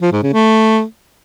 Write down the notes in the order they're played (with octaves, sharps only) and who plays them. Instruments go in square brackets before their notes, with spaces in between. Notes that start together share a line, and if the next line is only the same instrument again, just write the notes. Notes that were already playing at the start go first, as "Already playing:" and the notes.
[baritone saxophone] F3
G#2
C#3
A3